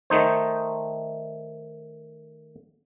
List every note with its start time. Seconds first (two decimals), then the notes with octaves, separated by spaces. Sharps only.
0.10 D#3 A3 D#4 C5